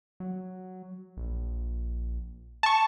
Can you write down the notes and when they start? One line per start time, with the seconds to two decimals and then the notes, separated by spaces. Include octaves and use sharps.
0.20 F#3
1.17 A#1
2.63 A5 C#6